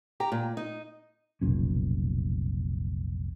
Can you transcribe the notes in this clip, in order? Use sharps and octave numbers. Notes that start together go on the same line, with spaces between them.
G4 G5 A#5
A#2
D#4
F1 B1 A#2 C#4